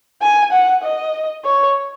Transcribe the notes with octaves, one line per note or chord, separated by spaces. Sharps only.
G#5
F#5
D#5
C#5